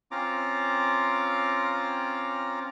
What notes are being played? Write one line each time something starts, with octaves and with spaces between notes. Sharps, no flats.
C4 C#4 F4 A#5 D6